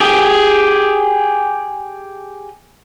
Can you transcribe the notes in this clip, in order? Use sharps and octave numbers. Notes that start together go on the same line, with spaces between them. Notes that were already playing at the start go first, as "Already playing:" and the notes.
G4 G#4